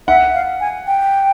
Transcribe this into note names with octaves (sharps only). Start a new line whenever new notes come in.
E5 F#5
F5
G#5
G5